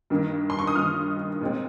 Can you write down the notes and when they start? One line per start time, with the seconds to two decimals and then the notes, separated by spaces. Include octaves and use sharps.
0.10 G2 D#3 A#3
0.50 C6
0.59 C#6
0.67 D#6
0.75 G2 D#3 A#3 F6
1.41 A#2 G#3 C4